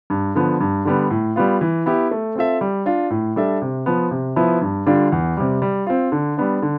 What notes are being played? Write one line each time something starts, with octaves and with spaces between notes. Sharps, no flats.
G2
D3 F3 B3
G2
D3 G3 B3
A2
G3 B3 F4
E3
B3 E4 G4
A3
C4 F4 A4 E5
G3
D4 F4
A2
G3 D4 A4 E5
C3
F3 B3
C3
F3 B3 E4 B4
G2
D3 G3 D4 F4
E2
C3 G3
G3
C4 F4
D3
G3 B3 D4
D3